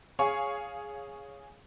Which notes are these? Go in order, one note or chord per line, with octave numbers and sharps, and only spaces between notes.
G#4 C#5 F5 G#5 C#6